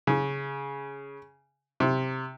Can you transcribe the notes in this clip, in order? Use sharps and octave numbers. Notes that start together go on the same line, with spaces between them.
C#3
C3